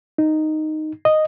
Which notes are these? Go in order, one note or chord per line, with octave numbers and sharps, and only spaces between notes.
D#4
D#5